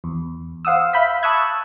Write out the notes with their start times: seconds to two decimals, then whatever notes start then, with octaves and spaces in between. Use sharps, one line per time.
0.04 E2
0.65 C5 F5 F#5 D#6 E6
0.93 E5 F5 B5 G6 B6
1.23 A5 C#6 D#6 E6 F#6 G#6